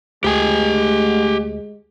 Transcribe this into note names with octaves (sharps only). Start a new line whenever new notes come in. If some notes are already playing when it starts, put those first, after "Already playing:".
D2 G#3 A3 G4 G#5